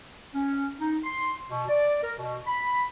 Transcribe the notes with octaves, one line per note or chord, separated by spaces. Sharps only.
C#4
D#4
C6
B2
D5
A#4
B2
B5